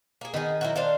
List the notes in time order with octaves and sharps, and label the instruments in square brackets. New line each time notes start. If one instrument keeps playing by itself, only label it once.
[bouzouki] A#3 G#4
[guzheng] D#3 [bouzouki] B3 G#4
[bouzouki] F#3 E4 F#4
D4 C5 F5